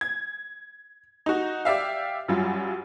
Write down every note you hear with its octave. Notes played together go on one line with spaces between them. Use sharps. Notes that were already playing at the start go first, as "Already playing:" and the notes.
G#6
D#4 F#4
G4 D5 E5 F5
F#2 F#3 G3 F4